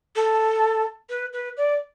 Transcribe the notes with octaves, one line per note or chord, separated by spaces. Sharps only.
A4
B4
B4
D5